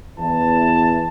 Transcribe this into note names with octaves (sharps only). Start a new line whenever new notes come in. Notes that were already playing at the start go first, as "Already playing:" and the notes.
E2 E3 A5